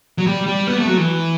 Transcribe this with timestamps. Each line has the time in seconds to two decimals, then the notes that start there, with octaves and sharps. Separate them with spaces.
0.18 F#3
0.27 G3
0.47 G3
0.67 B3
0.77 A3
0.87 F#3
0.98 E3